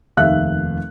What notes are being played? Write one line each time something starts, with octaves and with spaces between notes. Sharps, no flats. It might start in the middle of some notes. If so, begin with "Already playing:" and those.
F1 D#2 E5 F5 F#6